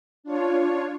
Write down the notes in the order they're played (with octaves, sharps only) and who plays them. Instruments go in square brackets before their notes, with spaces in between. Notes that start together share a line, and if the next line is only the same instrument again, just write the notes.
[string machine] D4 F4 C#5